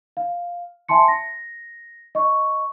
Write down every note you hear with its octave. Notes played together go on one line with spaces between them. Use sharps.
F5
E5 G#5 A5 C6 C#7
A#6
D#5 C#6